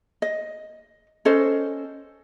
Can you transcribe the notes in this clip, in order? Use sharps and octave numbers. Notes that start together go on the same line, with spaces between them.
D#5
C#4 A4 C5 D#5